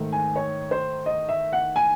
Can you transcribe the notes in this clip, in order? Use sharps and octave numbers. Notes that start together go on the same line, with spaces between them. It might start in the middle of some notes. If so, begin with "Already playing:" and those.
Already playing: G#2 D#3 A3
G#5
C#5
C5
D#5
E5
F#5
G#5